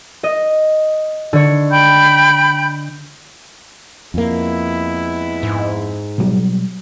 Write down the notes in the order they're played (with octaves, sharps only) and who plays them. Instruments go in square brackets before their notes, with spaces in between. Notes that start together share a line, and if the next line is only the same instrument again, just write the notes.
[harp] D#5
D3 C#5
[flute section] G5 B5 G6
[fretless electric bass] F2 A#3 [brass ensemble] G#3 B3 E4
[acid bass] G#2
[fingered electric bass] B2 F#3 G3